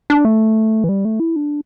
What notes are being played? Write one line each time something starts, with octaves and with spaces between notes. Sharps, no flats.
D4
A3
E3
G3
A3
E4
D4